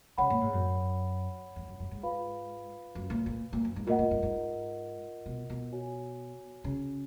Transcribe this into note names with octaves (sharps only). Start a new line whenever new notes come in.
C#3 C#5 F#5 B5
A#2
G#2
F#2
F2
F#2
F#2
G#2
F4 B4 F5 B5
F#2
A#2
A#2
A#2
F#2
G#2
A#2 F4 A#4 D#5 F#5
A#2
G#2
G#2
B2
B2
F#4 C#5 G#5
C#3